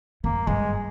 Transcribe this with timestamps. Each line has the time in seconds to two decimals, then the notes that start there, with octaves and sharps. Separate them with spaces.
0.24 F2 A#3
0.47 G2 G#3